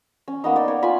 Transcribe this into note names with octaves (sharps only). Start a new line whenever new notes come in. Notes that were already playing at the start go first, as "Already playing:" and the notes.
C#4
A#3 B3 D#4
D5 G5
C#5
F4 G#5 B5